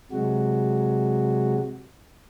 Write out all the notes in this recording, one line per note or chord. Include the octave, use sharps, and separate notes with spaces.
C3 F#3 G#3 F#4